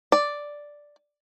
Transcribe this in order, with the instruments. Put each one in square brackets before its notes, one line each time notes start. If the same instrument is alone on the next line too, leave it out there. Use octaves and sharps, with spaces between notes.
[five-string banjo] D5